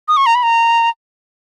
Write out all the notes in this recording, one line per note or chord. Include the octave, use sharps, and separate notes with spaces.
D#6
C#6
A#5
B5
A#5